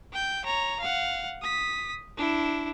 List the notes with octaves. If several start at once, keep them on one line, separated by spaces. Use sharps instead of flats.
G5 G6
C#5 A#5
F5 F#5
D#6 B6
D4 E4